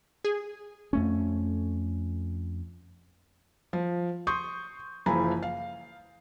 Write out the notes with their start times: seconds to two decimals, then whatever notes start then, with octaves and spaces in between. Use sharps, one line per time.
0.25 G#4
0.93 F2 A3 C#4
3.73 F3
4.27 C6 C#6 D#6 G6
5.06 F#1 E3 F3 G#5 A#5 B5
5.43 F5